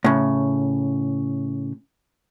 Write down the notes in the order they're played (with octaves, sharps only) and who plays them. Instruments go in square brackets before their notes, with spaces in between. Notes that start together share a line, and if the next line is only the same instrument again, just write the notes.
[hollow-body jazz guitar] A2 C#3